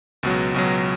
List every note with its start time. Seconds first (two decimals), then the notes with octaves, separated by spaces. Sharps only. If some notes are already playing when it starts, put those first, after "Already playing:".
0.23 C#2 B2 F#3
0.54 C#2 B2 F#3